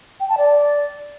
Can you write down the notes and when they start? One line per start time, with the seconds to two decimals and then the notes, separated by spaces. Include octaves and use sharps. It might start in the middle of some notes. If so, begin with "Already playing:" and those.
0.20 G5
0.29 A5
0.38 D5